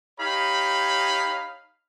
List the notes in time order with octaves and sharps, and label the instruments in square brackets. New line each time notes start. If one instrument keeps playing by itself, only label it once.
[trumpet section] D#4 G4 C#5 F5 B5